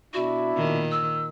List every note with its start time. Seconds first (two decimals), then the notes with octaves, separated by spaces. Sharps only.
0.14 B2 D4 E4 F#4
0.54 A#2 D#3
0.92 E6